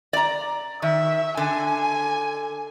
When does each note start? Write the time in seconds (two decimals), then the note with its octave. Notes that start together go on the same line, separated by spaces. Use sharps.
0.13 D5 A#5
0.82 D#3 E5
1.37 D3 G#5